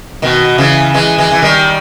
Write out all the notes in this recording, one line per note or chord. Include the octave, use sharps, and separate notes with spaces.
B2 D#3
C#3 E3
E3 G#3
E3 G#3
E3
D#3 G3